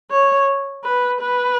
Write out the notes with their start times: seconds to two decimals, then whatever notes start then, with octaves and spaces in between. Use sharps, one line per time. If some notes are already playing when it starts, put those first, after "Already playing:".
0.11 C#5
0.84 B4
1.21 B4